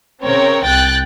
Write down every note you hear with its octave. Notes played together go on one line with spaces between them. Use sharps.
C#3 C4 A#4 C#5
C2 G5 F#6 A6